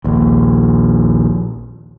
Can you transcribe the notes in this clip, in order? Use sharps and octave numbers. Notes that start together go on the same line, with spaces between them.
A#1 D#2